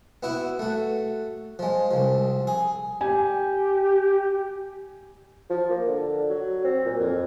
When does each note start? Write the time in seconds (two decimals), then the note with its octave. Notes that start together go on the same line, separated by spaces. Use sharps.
0.23 B3 E4 F#4
0.59 A3 F#4
1.59 F3 G#3
1.91 C2 F3
2.47 G#4
3.01 G4 G#5
5.50 F3
5.70 A#3
5.87 D3
6.29 F#3
6.64 C4
6.85 A#2
7.00 F2